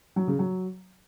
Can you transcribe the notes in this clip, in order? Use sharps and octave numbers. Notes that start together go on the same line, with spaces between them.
F#3
C#3
F#3